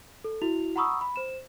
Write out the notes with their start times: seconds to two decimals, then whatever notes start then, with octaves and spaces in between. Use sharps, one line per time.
0.24 A4
0.42 E4 F#4 F7
0.76 F#5 A#5 B5 C#6 D#6 E6
1.01 B5
1.16 C5 E7